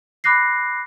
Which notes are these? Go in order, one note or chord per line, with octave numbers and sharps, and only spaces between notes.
B5 D6 F#6 A#6 C7